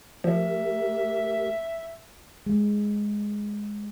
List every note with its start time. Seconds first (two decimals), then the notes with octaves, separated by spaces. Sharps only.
0.24 F3 A3 G4 A#4 E5
2.46 G#3